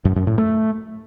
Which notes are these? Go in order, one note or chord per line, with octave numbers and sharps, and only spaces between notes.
F#2
F#2
A2
A3